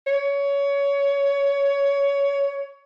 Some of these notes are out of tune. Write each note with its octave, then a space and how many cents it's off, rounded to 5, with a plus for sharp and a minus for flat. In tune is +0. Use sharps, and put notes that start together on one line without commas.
C#5 +20